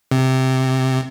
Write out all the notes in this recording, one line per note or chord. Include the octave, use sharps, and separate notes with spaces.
C3